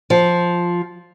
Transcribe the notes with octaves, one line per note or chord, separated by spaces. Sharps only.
F3